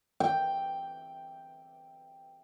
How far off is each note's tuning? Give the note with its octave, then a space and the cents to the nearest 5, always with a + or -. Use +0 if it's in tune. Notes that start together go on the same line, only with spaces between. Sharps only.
G5 +0